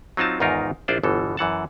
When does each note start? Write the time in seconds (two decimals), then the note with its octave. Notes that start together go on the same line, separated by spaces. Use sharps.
0.17 F#3 C4 D#4 F4 A5
0.40 E2 G#2 D#3 D#4 F4 A#4
0.88 A#1 D4 E4 F4 C5 D5
1.03 G1 B2 E3 A4
1.37 F#2 E3 F#5 A5